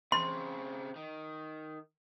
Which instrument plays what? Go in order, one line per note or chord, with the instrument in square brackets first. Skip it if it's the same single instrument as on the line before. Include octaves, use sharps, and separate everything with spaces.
[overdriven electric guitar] C#3 C4 [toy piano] C6
[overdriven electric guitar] D#3